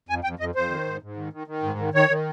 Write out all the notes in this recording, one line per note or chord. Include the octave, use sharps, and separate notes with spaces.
F2 G#5
F2 G5
F2 D#5
F2 C5
D#3
G#2
G#2
D#3
D#3
D#3
G#2
D#3
D#3 C#5
D#3